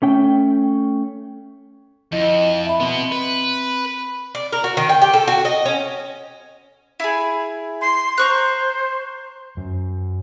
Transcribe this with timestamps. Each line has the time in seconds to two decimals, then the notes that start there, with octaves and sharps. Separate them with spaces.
0.02 A3 C#4 G5
2.12 F2 E4 D#5
2.66 E5 B5
2.80 B2 B3 C4
3.11 B4
4.35 D5
4.52 A#4
4.64 F#4
4.77 D#3
4.89 G5
5.02 G4
5.13 A4
5.27 F#4
5.45 D#5
5.65 C#4
7.00 E4 G#4
7.81 C6
8.18 C5 A#5 C#6 F#6
9.57 F#2